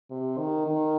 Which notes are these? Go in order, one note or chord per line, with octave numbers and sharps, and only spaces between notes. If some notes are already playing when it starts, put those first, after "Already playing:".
C3
D#3
D#3